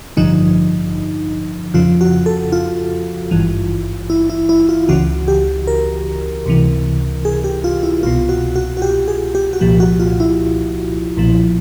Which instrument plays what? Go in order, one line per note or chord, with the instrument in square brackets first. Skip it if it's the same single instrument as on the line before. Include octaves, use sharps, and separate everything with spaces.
[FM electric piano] A1 G2 D3 F3 D#4
F2 C#3 F3 F4
F#4
A4
F4
G#1 G2 E3
E4
E4
E4
F4
C#2 C#3 E3 F#4
G4
A#4
C#2 C3 E3
G#4
G4
F4
E4
C2 B2 F4
F#4
F#4
F#4
G4
G#4
G4
F#4
C2 A#2 F3 G4
F#4
F4
E4
B1 A#2 F3